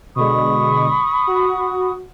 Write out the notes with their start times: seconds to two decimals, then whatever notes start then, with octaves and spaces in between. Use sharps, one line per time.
0.15 B2 D3 G#3 B5 C#6 D#6
1.27 F#4